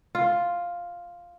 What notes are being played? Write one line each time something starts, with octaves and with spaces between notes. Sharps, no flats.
F4